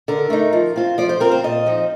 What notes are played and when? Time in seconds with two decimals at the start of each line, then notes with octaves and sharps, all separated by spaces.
0.08 D3 A#4
0.30 A3 D#4
0.53 F3
0.76 C4 F4
0.98 F3 D5
1.09 C5
1.20 C4 F4 A#4
1.31 C5
1.44 A#2 D#5
1.66 F3 C4 D#4